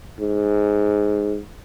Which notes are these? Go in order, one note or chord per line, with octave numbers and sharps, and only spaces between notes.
G#2